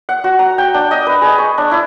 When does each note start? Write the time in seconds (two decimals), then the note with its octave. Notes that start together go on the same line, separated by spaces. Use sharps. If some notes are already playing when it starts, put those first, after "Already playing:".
0.09 F#5
0.24 F#4
0.39 A#5
0.58 G5
0.74 D4
0.91 D#5
1.07 B4
1.22 G#4
1.38 C#6
1.58 D4
1.71 E4